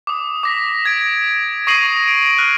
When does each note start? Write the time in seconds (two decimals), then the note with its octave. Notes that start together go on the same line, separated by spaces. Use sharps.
0.07 D6 D#6
0.43 D6 A#6 B6
0.85 G#6 D7
1.67 C#6 D#6 A#6 C7 D#7 F#7
2.08 D7
2.38 F6 F#6 D#7